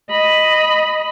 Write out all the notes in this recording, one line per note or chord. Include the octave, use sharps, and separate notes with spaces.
D#5 B5